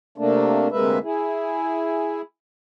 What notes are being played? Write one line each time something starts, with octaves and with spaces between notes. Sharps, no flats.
C3 A3 A#3 D4
D2 C3 G#3 A#3 B4 E5
E4 G#4